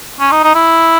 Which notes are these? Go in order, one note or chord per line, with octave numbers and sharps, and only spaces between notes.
C#4
D#4
D#4
E4